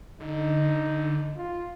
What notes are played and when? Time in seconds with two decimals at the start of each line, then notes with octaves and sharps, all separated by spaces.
0.20 D3 D#4
1.36 F4